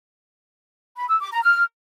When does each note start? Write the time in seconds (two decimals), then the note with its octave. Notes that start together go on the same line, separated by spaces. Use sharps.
0.96 B5
1.08 E6
1.20 D6
1.31 A#5
1.43 F6